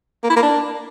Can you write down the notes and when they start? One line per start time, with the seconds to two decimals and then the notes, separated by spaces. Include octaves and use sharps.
0.24 A#3
0.30 E4
0.36 A#3
0.43 D4